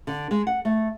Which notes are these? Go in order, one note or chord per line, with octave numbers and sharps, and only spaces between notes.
D3
G#3
F#5
A3